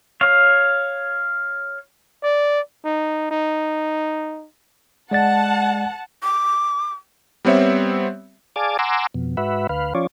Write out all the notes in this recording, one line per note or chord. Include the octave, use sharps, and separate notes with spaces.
C#5 F5
D5
D#4
D#4
G#3 D5 F#5 A5 A6
D6
G3 B3 C4 C#5 E5
G#4 D5 F5 G#5 A5 D6
F#5 G#5 A#5 C6 D6 E6
F2 B2
G#2 F#4 B4 E5
D2 B4 F5
F3 C#4 F4 C#5 D5